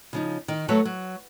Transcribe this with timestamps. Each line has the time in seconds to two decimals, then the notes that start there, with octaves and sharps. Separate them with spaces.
0.13 C#3 F3 D#4
0.48 D#3
0.68 F#3 A3 F#4 A4 B4 C#5
0.85 F#3